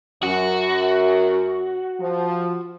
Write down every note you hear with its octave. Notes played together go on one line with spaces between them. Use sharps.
F#2 F#4
F3